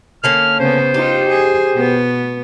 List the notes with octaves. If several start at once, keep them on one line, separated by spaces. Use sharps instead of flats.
D3 A#3 C#4 F6
C#3 B3 C5
D#4 F4 G4
G#4
B2 B3